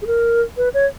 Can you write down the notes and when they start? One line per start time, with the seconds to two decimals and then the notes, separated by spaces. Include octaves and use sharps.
0.02 G#4
0.07 A#4
0.57 B4
0.74 C#5